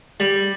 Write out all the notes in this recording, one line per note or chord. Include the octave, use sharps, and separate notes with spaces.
G3